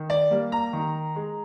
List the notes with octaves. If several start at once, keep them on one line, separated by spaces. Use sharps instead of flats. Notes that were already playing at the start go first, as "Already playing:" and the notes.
Already playing: D#3
D5
G3 A#3
A#5
D#3
G#3